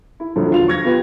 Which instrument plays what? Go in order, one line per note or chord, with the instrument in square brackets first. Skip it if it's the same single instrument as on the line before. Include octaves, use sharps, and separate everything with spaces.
[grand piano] E4
A#1 D3 F#3
E1 F4 F7
C#6 G#6 A#6
B3 F4 G4 B4